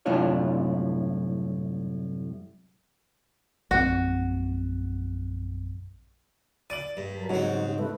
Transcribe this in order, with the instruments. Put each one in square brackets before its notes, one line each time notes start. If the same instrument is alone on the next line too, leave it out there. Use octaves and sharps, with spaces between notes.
[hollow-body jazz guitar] C2 F#2 A2 D4 F4 C#5
[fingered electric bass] A#1 F#2 C4 [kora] F#4
[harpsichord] D5 [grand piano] D#7 F#7
[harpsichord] G2
[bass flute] F#3 [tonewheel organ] A#4 A5 B5
[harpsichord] G#2 C4 [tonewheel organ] C#3 G3 D#4 [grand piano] F#4 C#5
[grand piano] A3 [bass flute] B4